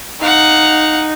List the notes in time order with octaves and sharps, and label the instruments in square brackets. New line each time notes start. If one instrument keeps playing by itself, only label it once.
[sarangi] D#4 [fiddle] F5 F#5